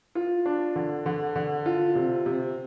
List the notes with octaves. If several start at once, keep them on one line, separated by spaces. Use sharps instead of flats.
F4
D4
D3
D3
D3
F4
C3
C3